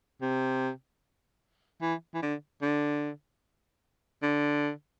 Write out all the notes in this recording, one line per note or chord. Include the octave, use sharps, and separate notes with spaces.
C3
E3
E3
D3
D3
D3